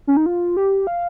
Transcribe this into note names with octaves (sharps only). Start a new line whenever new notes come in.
C#4
D#4
F4
G4
F5